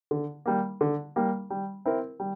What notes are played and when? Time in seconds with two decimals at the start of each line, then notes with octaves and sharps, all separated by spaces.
0.11 D3
0.46 G3 A#3
0.81 D3
1.16 G3 A#3
1.50 G3
1.85 C4 E4 A#4
2.20 G3